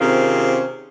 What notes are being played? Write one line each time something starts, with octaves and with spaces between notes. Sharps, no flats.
C3 D#3 C4 C#4 F4 G#4